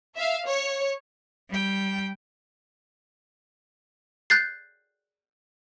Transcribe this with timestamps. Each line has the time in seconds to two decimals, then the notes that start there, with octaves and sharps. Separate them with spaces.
0.16 E5 F5
0.47 C#5
1.50 G3 G5
4.30 F#6 G6 A6 C7